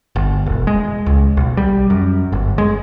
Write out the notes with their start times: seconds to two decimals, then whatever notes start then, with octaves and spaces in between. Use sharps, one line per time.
0.16 G1
0.46 E1
0.67 G#3
1.06 C#2
1.37 B1
1.57 G3
1.90 F#2
2.32 G1
2.58 G#3